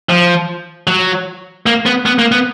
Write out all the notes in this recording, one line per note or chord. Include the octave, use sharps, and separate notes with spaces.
F3
F#3
A#3
B3
B3
A#3
B3